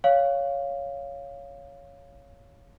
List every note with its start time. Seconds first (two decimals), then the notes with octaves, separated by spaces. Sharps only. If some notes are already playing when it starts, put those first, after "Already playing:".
0.04 C#5 F5